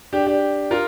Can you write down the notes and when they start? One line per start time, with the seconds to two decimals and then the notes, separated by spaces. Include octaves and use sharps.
0.13 D4 G4
0.26 D4 G4
0.71 F4 A#4